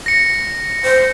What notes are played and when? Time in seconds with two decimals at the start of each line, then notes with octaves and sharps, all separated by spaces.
0.06 A#6 C#7
0.84 C5